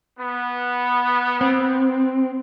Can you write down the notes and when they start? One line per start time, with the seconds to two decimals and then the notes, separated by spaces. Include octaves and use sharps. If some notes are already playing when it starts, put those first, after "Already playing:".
0.19 B3
1.41 C4